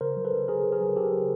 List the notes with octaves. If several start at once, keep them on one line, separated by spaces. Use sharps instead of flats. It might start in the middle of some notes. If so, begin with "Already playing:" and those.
C#3 A#4 C5
F#3
A4 B4
C#3
F#3 G#4 A#4
C#3
G#4 A#4
F#3
C#3 G4 A4
F#3